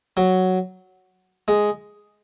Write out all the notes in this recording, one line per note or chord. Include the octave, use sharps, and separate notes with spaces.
F#3
G#3